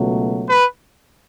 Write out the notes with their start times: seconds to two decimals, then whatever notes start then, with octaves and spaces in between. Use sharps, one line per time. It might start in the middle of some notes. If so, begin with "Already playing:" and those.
Already playing: C#2 B2 F#3 A3
0.48 B4